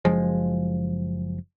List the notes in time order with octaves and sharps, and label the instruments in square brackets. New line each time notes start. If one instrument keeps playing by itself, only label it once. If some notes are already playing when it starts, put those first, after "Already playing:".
[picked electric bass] F#1 F3 G#3